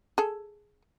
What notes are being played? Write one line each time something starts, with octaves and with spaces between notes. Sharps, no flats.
G#4 A4